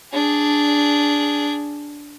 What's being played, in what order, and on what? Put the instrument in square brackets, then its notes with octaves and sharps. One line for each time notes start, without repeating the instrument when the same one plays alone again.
[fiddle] D4 G#4